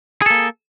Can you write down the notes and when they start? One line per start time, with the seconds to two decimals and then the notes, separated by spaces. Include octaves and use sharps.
0.22 G#4
0.26 A4
0.30 A#3